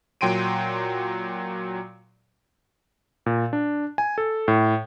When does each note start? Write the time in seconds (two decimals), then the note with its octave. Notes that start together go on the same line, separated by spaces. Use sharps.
0.21 A#2 F#3 G5 C6 D7 D#7
3.26 A#2
3.53 D4
3.98 G#5
4.18 A4
4.48 A2